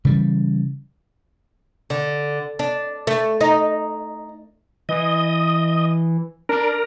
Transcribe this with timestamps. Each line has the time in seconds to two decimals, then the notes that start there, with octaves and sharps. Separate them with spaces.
0.05 C#3 E3 G3
1.90 D3
2.59 D4
3.07 A3
3.40 D#4
4.89 E3 D#5
6.49 D4 A#4